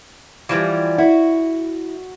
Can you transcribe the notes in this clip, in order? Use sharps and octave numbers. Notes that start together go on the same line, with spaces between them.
E3 F3 G3
E4 F#4